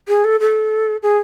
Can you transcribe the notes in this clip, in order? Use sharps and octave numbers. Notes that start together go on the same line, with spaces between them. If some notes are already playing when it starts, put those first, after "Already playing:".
G#4
A4
A4
G#4